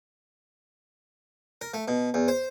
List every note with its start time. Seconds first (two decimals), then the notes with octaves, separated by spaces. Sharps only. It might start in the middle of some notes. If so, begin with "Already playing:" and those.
1.61 A#4
1.74 A3
1.88 B2
2.14 E2
2.28 C5